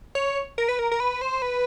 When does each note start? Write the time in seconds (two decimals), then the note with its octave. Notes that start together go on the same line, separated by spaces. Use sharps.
0.15 C#5
0.58 A#4
0.69 B4
0.79 A#4
0.91 A#4
1.00 B4
1.22 C5
1.42 B4